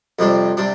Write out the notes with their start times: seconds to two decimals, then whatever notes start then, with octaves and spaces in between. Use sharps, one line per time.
0.19 F2 C3 G3 D4
0.57 C3 G3 D4